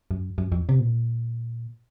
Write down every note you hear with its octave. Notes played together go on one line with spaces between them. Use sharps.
F#2
F#2
F2
C3
A#2